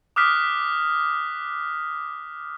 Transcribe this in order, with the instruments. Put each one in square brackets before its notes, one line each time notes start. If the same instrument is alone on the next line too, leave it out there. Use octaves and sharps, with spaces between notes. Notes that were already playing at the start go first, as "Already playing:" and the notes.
[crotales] D6 D#6 F6 F#6 B6